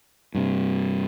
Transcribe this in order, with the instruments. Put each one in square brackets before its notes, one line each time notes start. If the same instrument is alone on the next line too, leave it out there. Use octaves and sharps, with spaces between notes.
[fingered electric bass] G2 C3